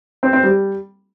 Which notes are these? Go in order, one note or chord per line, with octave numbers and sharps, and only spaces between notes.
C4
C4
G3